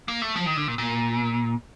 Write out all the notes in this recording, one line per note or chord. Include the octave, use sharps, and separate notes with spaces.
A#3
A3
F3
D#3
D3
A#2
A#2